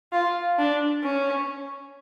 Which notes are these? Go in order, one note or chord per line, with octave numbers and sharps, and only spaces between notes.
F4
D4
C#4